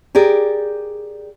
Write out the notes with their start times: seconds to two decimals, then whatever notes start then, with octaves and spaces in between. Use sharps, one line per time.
0.15 G4 G#4 A#4 D5